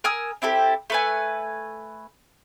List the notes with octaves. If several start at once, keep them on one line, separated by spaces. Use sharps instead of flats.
A#4 G#5 D#6 E6
C4 E4 G4 A4
A3 B4 G#5